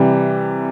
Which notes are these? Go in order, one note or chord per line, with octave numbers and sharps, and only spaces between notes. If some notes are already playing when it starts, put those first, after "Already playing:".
Already playing: C3 E3 G3